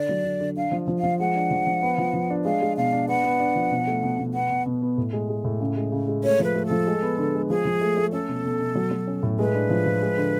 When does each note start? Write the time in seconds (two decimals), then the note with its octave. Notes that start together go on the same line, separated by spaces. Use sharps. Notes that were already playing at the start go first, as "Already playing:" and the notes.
Already playing: D3 D5
0.09 F#3
0.25 D3
0.40 D3
0.57 D4 F5
0.72 F3
0.88 F3
0.99 F3 F5
1.20 G#3 F#5
1.36 D4
1.51 F3
1.67 F3
1.82 B3
1.98 F3
2.14 F3
2.30 D4
2.45 G#3 F5
2.62 G#3
2.77 B2 F5
2.92 D4
3.08 B3 F#5
3.24 B3
3.40 D4
3.55 F3
3.71 B2
3.87 A3
4.03 B2
4.19 B2
4.34 B3 F#5
4.50 B2
4.66 B2
4.82 B3
4.98 A2
5.13 G#3
5.29 G#3
5.44 A2
5.60 C#3
5.76 G#3
5.92 C#3
6.08 G#3
6.24 A3 C#5
6.39 F3 B4
6.55 A3
6.66 F3 A4
6.87 G#3
7.02 B3
7.18 D3
7.34 G#3
7.50 F3 G#4
7.65 F3
7.81 A3
7.97 A3
8.13 C#4 A4
8.29 B2
8.44 B2
8.60 B2
8.75 F#3
8.91 F#3
9.07 C#4
9.23 A2
9.39 G#3 B4
9.54 D4
9.70 F3
9.86 F3
10.02 G#3
10.17 D3